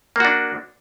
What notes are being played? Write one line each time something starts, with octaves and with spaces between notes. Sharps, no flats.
A#3 D4 F#4